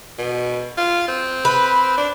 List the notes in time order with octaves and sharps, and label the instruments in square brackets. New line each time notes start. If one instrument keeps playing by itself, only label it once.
[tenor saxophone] B2
F4
C4
[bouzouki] B4
[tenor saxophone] D4